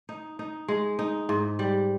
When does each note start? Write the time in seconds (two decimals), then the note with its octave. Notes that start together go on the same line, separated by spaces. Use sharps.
0.09 D#4
0.39 D#4
0.68 G#3
0.99 D#4
1.29 G#2
1.59 G3